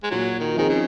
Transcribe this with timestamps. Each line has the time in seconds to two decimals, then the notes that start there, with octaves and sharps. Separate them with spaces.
0.03 G#3
0.11 A#2 F#3
0.40 D#3
0.55 D#3 F3 C4 D#4 G#4
0.69 C#3